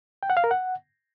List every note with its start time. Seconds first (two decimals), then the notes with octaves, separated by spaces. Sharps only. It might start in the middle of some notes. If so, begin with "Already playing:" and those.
0.23 G5
0.30 F#5
0.37 F5
0.44 A#4
0.51 F#5